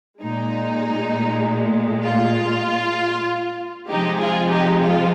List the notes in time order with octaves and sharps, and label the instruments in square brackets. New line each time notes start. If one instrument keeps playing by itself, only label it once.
[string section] A#2 G#3 D#4
F4
C3 F3 G#3 D#4 G4
F4 G#4
D#4 G4
F4